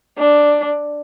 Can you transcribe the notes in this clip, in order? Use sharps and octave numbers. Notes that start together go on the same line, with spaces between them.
D4